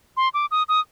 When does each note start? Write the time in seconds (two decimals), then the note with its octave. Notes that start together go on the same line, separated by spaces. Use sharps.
0.17 C6
0.34 D6
0.51 D#6
0.69 D#6